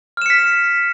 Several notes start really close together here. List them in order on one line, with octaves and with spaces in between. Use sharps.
F6 E7 C#7 B6